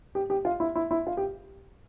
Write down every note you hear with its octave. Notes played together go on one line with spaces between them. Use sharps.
G4
G4
F4
E4
E4
E4
F4
G4